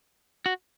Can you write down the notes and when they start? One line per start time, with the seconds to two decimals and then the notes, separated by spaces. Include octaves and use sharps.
0.46 F#4